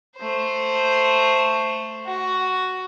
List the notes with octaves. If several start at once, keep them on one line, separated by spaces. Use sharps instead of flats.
A3 C5
F#4